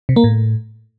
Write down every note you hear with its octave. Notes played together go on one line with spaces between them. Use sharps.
C3
A#3
A2